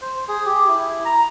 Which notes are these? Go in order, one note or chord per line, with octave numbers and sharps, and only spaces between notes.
C5
G#4
G4
E4
A#5